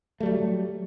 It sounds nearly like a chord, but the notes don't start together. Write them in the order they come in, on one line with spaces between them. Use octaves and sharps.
A3 G3 F#3